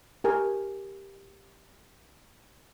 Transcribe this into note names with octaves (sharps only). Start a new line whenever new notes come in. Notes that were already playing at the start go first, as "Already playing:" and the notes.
G4 A#4 G#5